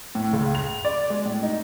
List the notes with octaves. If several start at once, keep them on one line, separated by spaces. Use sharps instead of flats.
A2
C#2
F7
D5
G#3
A2
D#4